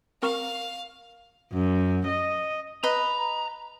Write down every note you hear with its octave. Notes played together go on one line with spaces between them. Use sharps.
C4 A#4 F5 C#6
F#2
D#5
B4 D#5 A#5 B5